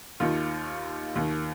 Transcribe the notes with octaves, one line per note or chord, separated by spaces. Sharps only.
D#2 D#3 F4
D#2 D#3